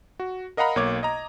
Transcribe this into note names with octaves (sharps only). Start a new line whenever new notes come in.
F#4
A#4 D#5 F5 F#5 A#5 B5
B1 A#3 C#5 D6 G#6
D#5 A#5